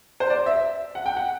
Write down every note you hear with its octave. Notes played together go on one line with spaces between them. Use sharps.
C5
D5
E5
F#5
G5
F#5